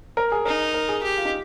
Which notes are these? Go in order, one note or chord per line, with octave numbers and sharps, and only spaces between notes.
A#4
G#4
D#4 A#4
A#4
G#4
G4
F4
D#4